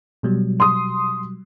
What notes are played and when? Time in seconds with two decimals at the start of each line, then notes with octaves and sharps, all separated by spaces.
0.23 B2 F#3 G3
0.60 C6 D#6